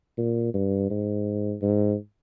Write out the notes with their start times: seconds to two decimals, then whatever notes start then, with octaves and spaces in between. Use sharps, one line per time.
0.18 A#2
0.54 G2
0.90 G#2
1.62 G#2